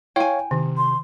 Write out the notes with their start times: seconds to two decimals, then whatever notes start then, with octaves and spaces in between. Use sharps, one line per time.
0.16 E4 C#5 F5 G5 G#5
0.51 C3 D#3
0.77 C6